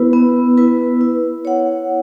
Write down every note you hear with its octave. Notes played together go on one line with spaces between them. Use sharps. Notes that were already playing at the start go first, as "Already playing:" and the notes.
Already playing: B3 E4 B4
B3
E4 B4
E4
C#5 F#5